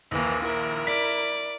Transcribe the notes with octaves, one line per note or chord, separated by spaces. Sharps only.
A#1 D#2 E3 A#3
E4 A#4
D5 B6